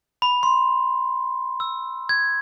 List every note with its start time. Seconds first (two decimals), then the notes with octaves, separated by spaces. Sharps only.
0.22 B5
0.43 C6
1.60 E6
2.09 G#6